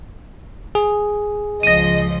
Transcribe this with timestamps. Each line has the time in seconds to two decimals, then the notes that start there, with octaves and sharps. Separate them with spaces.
0.75 G#4
1.63 C#2 F3 D#5 A#6 D#7